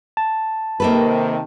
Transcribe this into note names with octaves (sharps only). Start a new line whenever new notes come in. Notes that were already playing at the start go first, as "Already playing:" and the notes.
A5
C3 D#3 A#3 A4 B4